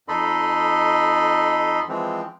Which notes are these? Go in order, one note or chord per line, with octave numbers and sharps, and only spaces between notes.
F2 D#4 A4 D#5 B5 C6
E3 F3 G#3 C4